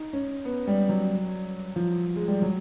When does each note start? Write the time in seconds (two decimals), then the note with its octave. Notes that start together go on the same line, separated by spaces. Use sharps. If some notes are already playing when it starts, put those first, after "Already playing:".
Already playing: D#4
0.13 C#4
0.45 B3
0.67 G3
0.89 F#3
1.76 F3
2.16 G#3
2.28 G3
2.42 F#3